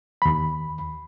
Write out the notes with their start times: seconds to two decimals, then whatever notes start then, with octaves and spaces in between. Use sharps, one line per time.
0.22 D#2 B5